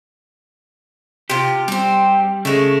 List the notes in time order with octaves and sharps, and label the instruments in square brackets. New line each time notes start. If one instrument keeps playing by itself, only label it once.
[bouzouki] C3 F4 [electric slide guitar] G4
[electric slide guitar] G3 [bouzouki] C4 G4
[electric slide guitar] C#3 [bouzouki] G#3 A3